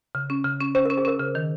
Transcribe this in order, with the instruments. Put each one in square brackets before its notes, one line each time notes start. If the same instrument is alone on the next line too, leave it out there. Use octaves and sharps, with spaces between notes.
[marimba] C#3
C#4
C#3
C#4
[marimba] C#4 [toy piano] C5
[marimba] C#4 [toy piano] A#4
[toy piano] G#4
[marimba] C#4 [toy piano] A#4
[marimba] C#3
D#3